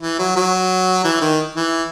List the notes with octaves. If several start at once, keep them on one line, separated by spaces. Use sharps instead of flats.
E3
F#3
F#3
E3
D#3
E3